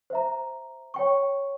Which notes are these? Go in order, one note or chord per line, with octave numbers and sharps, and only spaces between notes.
C5 E5 A#5
C#5 G5 C#6